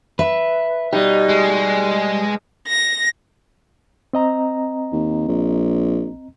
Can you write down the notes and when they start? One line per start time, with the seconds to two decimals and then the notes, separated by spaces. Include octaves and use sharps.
0.19 B4 E5
0.93 B2 G3 D#4 G4
1.29 G#3
2.67 A#6
4.13 C4 D#5 A#5
4.93 D#2
5.28 A#1